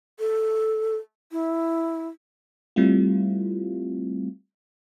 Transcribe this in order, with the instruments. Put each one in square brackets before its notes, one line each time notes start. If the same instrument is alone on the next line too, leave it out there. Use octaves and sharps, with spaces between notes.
[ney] A4
E4
[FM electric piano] G3 A3 C4 E4 F4